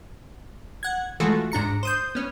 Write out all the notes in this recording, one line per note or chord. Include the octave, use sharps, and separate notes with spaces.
F#5 G#6
E3 G#3 A3 F4 F#4 A4
G#2 D4 A#5 C#7
C5 D#6 G6
B3 C#4